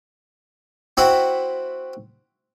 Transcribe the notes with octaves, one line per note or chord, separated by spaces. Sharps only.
C4 E4 F#4 E5